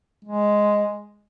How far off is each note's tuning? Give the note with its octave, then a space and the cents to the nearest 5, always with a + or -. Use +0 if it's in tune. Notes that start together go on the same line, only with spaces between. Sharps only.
G#3 +0